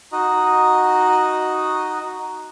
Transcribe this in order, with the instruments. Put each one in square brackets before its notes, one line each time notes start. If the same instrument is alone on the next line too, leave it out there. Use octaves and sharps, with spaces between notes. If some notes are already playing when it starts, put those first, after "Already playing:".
[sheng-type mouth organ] D#4 F#4 D#5